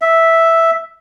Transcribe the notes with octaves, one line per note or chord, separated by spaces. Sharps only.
E5